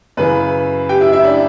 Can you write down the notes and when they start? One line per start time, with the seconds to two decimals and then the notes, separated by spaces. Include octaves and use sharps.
0.17 F#2 C#3 E3 B4 B5
0.89 G4 G5
1.01 E4 E5
1.12 E4 E5
1.24 D4 D5